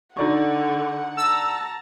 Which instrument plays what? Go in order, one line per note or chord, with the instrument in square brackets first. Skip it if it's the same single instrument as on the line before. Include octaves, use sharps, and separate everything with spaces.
[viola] D3 [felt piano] D#4 D5 C#6 [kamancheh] F#5
[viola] A5 A#5 [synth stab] E6